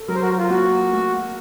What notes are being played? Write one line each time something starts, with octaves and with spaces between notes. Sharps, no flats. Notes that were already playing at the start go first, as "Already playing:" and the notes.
Already playing: A4
F#3 A#4
C5
F#4 A#4
F4
A#3 F#4
A3